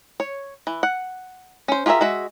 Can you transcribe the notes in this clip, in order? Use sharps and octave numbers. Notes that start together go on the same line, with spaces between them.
C#5
E3
F#5
C#4 C5
F4 G4 G#4 A#4 E5
G#3 F#4 E5